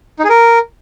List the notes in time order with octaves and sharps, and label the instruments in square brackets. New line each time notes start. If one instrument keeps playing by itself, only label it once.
[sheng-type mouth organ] D#4
G#4
A#4